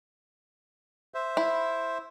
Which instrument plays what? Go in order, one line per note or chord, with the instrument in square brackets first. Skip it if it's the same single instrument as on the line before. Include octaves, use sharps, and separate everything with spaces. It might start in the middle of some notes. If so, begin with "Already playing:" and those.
[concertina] C5 E5
[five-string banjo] E4